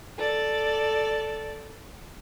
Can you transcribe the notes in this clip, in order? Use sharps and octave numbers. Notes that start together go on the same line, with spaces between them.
A4 D5